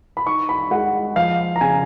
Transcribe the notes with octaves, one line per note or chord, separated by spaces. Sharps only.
B5
D#4 C#6
B5
G#3 F#5
F3 F5
A#5
C#3 G#5